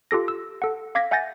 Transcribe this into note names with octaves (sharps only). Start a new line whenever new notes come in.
F4 G4 A4 A#6
E6
A4 F#5
F5 D6 G#6 A#6 B6
E5 F#5 G#5 G6 A6 A#6